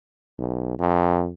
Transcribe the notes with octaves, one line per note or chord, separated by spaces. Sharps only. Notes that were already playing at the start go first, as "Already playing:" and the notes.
B1
F2